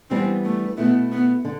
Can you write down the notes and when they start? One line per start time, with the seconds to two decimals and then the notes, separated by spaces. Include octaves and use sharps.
0.10 E3 G3 B3 C4 D4
0.45 A3
0.77 B2 A3 B3 E4
1.12 B3
1.45 D3